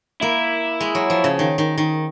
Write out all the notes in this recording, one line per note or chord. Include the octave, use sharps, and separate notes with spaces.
A#3 E4
G#3
F#3
F3
C#3
D#3
D#3
D#3